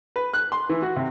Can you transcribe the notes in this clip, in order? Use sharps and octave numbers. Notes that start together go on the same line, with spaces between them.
B4
F#6
C6
E3
F#4
C3